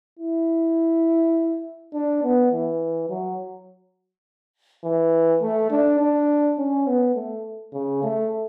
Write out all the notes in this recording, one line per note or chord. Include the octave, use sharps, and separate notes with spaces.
E4
D4
B3
E3
F#3
E3
A3
D4
D4
C#4
B3
A3
C#3
A3